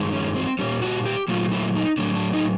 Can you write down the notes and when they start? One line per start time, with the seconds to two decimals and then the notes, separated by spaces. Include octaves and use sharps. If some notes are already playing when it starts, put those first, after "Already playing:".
Already playing: G2 D#3 G#3
0.13 C#4
0.36 C4
0.59 A#2 G3 C#4
0.82 F#4
1.06 G4
1.28 A#2 F#3 A3 F4
1.52 E4
1.75 D#4
1.98 A2 F#3 A3 D4
2.15 D4
2.33 D#4